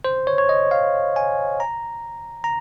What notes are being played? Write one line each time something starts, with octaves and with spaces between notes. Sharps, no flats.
C5
C#5
C#5
D#5
F5
G#5
A#5
A#5